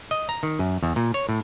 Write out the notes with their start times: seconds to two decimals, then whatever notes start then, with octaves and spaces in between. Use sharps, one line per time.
0.11 D#5
0.29 A#5
0.43 D#3
0.59 F#2
0.83 E2
0.96 A#2
1.14 C#5
1.29 A2